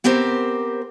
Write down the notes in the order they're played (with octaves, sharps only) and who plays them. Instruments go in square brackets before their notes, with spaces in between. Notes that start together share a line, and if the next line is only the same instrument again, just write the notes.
[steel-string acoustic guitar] B3 C4 G4 A#4 C5